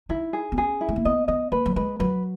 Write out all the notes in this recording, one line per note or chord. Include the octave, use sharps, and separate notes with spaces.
D#4 E4
G#4
B3
C#4 G#4
E4
G#3
A#3
B3 D#5
B3 D#5
A#3 B4
F#3
G#3 B4
F#3 B4